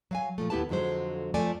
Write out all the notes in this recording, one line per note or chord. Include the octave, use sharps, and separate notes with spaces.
F#3 F5 G#5
A#2 F3 A3
D#2 B3 E4 G4 B4 A5
F2 D3 F#3 G#3 C5
F2 F3 A3 D5 G#5